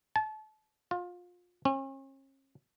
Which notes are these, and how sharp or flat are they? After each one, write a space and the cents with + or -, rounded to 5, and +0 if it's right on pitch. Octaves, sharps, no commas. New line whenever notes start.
A5 -30
F4 +25
C#4 -40